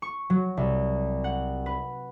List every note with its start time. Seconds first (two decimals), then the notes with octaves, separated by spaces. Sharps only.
0.02 C#6
0.30 F#3
0.57 C2
1.24 F#5
1.66 B4